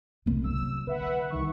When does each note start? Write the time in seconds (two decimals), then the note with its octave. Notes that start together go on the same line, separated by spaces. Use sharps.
0.26 C2 D3
0.44 F#3 E6
0.87 D3 B4 E5 F#5
1.30 C2 D#3 C#6